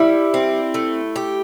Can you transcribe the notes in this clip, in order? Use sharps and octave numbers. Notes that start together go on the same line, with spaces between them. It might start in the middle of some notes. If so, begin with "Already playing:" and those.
Already playing: G3 E4
C4
A3
G4